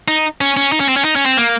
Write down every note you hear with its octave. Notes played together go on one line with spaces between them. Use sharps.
D#4
C#4
C#4
D#4
C#4
C4
C#4
D#4
C#4
C4
A#3